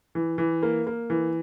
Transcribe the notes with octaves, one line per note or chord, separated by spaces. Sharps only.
E3
E3
A#3
A#3
E3